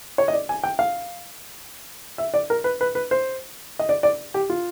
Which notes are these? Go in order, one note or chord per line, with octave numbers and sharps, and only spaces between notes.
C#5
D#5
D5
G#5
G5
F5
E5
D5
A#4
B4
B4
B4
C5
D#5
D5
D5
G4
F4